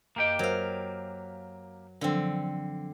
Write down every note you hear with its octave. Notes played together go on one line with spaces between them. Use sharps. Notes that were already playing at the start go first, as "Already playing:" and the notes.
F#2 A#3 G4 D#5 G5
F#3 A#4 C5 F5
D3 F3 F#3 C4